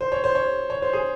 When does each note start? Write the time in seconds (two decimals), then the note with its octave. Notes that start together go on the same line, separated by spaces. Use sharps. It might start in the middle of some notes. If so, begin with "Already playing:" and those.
0.01 C5
0.12 C#5
0.24 C5
0.35 C#5
0.70 C#5
0.82 C5
0.93 G#4